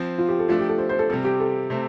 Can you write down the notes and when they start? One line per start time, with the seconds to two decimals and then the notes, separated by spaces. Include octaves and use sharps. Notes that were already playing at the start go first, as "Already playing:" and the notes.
Already playing: F3 C4
0.18 F4
0.28 G4
0.39 A4
0.48 F3 A3 D4 F4
0.59 G4
0.69 A4
0.78 C5
0.89 C5
0.99 A4
1.09 C3 G3 C4 A4
1.25 G4
1.40 A4
1.70 C3 A3 C4